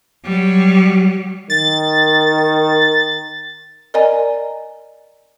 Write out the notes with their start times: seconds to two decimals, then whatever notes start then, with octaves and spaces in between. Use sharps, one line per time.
0.24 F#3 G3
1.50 D#3 A6
3.94 A#4 D5 D#5 G#5 A#5